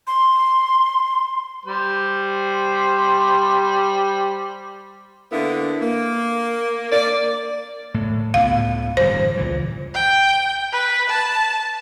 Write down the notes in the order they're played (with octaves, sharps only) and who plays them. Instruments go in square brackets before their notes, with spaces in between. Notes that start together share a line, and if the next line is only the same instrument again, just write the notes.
[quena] C6
[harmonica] G3 C5
[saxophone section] D3 A#3 B3 E4
A#3
A#3 D5
[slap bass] A2
[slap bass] C#2 A2 B3 [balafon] F5
[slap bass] D1 G2 E3 [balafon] C5
[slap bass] C#2 A#2 E3
[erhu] G5
B4
A5